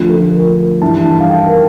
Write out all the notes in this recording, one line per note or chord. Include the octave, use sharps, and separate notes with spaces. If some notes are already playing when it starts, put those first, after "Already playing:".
Already playing: D2 D3 F3 F4
A4
A#4
G2 E3 A5
A5
F5
G5
A#4